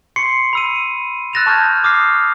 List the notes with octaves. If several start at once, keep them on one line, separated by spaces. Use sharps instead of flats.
C6 C#6 C7 C#7
B5 E6 D#7
E6 F#6 A6 A#6 E7 F7
A5 C#6 D#6 F6 G6 G#6
D6 D#6 F6 C7